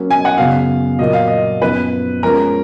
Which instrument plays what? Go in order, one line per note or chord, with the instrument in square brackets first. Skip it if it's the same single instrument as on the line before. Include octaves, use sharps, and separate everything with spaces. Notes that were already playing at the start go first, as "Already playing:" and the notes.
Already playing: [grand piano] F#3 A#3 C#4
[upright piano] G#5
F#5
[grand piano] F#2 C#3 F#3 B3 [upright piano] F5
[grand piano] A#2 F#3 A#3 F4 [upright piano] D#5
[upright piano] F5
D#5
[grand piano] F#2 F3 B3 D#4 [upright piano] B4
[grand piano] F3 G#3 C#4 [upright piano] A#4